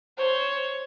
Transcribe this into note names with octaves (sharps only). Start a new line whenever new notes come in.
C5 C#5